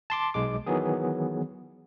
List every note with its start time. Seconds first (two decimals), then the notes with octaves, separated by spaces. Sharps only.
0.10 A5 C6 D6
0.34 B1 G#3 D6
0.66 D#3 E3 F#3 B3 G#4